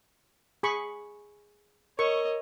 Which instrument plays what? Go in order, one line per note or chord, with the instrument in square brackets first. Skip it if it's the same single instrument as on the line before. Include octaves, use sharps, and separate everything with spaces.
[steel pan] G#4 B5 C#6
[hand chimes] A#4 [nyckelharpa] C#5 D#5 [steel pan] C#6